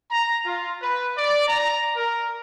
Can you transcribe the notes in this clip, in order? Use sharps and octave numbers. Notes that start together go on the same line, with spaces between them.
A#5
F4
B4
D5
A#5
A#4